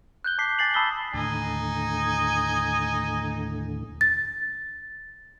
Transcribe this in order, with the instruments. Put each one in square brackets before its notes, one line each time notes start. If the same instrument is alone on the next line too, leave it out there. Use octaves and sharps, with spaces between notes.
[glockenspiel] F#6 G6 G7
A5 D6 B6 C7
G#5 A6 C7 F#7
A5 B5 D#6 E6 B6 G7
[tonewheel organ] D#2 A2 D3 [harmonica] D#4 G#5
[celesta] A6